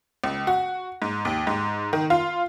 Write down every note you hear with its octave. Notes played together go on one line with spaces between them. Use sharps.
C#2
F#4
G#2
D#2
G#2
D#3
F4